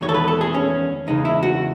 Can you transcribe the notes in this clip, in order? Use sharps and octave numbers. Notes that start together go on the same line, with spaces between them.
E2 D#3 G#3 B3 C#5
A4
B4
A4
G#4
C#4
E2 C#3 G#3 D#4
E4
F#4